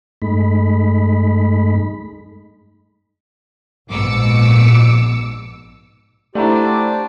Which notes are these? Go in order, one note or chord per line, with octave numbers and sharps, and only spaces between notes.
G2 G#3 A3 D#4 B5
A#1 G#2 B2 D6 E6 C#7
A3 D4 E4 G4 C5 D5 F#5 A#5